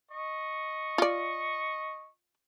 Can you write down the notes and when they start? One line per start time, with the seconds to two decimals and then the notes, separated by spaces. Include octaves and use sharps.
0.11 D#5 C#6
0.98 F4 D5